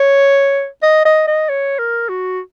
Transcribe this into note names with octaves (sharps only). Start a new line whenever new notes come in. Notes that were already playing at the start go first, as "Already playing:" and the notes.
Already playing: C#5
D#5
D#5
D#5
C#5
A#4
F#4